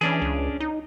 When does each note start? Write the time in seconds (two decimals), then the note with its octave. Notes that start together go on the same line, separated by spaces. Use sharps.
0.01 E3 C#4 D4 G#4
0.22 C#2
0.60 D#4